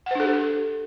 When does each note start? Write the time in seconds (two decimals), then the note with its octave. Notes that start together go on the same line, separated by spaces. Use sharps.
0.06 F#5
0.11 C5
0.15 D4
0.20 A4
0.24 G4